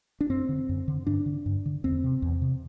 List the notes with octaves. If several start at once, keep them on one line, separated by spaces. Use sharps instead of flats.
D4
F#2 C4
D3
F#2
D3
G2 D4
D3
G2
D3
E2 C4
C3
E2
C3